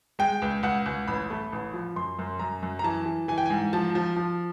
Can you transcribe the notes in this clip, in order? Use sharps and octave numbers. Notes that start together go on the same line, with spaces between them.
G#3 G5
C#2
C#2 F#5
C#2
A1 B5
A3
A1
F3
F#2 C6
F#2
F#2 A#5
F#2
A#5
E3 A5
E3
E3 G#5
G5
G#2 G#5
F3 A5
F3
F3